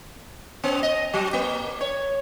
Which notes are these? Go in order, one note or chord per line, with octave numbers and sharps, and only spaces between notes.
B3
D#5
F#3
A#3
C#5